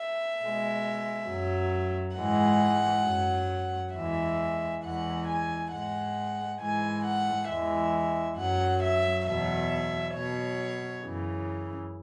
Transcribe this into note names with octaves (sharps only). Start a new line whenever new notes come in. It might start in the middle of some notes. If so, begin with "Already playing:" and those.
Already playing: E5
B2 G#3
F#2 F#3
G#2 E3 G#3 F#5
F#2 F#3
E2 E3 G#3 E5
E2 E3 G#3 F#5
G#5
G#2 G#3 F#5
G#2 E3 G#3 G#5
F#5
E2 E3 G#3 E5
F#2 F#3 F#5
E5
E2 B2 F#3 E5
B2 F#3 C#5
F#2 C#3 E3